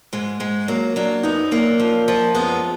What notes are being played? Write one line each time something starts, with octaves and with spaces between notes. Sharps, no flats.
G#2 G#3
G#2 G#3
F#3 A#3
F#3 A#3 D4
F#2 B3 D#4
F#2 A#3 D4
F3
F3
F#2 G#3 B3